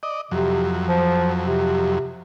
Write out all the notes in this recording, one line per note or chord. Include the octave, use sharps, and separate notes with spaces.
D5 D#5
F2 C3 F#3
F3
C3